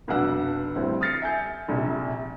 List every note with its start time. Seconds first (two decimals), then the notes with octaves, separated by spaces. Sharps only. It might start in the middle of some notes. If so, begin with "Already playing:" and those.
0.08 F1 B1 D4 F#4 F#5 E6
0.75 D2 A2 G3 C4
1.01 D#6 F6 A6 C7 C#7
1.22 E5 G#5 G6 C#7
1.68 A#1 C3